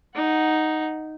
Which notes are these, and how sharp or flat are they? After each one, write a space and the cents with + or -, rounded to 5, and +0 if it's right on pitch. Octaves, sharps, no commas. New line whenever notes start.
D#4 +0 F#5 +0